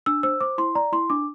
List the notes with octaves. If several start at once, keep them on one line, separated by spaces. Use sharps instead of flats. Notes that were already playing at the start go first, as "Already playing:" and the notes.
D4 E6
C5 E6
C5 D6
E4 C6
D5 A#5
E4 C6
D4 D6